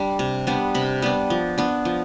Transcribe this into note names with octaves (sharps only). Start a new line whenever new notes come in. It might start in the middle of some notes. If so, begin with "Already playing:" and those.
Already playing: G3 D4
C3
G3 B3 D4
C3 B5
G3 B3 D4
F3
B3 D4
F3